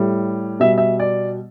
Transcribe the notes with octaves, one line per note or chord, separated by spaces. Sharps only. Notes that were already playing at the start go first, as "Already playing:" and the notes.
Already playing: A2 G3
B2 G3 E5
E5
D5